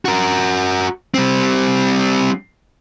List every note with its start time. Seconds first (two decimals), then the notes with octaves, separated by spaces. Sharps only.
0.05 F#4 A#4
1.14 G3 C4